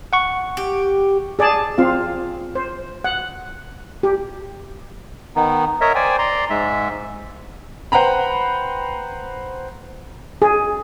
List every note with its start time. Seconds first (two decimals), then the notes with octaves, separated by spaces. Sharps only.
0.13 F#5 C#6
0.57 G4
1.39 G#4 D5 G#5 A5
1.78 C4 F4 F5
2.55 C5
3.04 F#5
4.03 G4
5.36 D#3 B3 D#4
5.81 A#4 C#5 D#5 E5
5.95 C5 D5 G5 G#5
6.18 D5 A#5 C6
6.50 G#2 G#3 E5
7.92 B4 C5 F#5 G5 A#5 B5
10.42 G#4